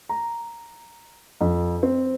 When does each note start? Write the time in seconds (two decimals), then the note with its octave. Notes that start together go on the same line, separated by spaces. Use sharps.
0.09 A#5
1.41 F2
1.83 C4